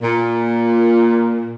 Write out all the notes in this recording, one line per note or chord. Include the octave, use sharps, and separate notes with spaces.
A#2